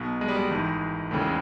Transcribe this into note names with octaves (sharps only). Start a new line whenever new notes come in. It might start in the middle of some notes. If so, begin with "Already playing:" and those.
Already playing: B1 B2
G#3
G3
G#3
G#1 G#2 E3
E1 D#2 C#3 E3 A3
G#3